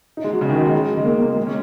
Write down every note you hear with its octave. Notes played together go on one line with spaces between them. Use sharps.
D#4
G#3
F#3
C#3
D#3
F#3
G#3
G#3
A#3
A#3
G#3
C#4